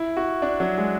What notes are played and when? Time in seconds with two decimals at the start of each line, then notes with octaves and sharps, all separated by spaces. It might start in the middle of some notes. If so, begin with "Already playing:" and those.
Already playing: E4
0.17 F#4
0.42 D4
0.60 F#3
0.78 G#3